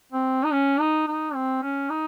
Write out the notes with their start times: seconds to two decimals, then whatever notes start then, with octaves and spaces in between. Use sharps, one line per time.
0.12 C4
0.44 D#4
0.52 C#4
0.80 D#4
1.07 D#4
1.34 C4
1.62 C#4
1.90 D#4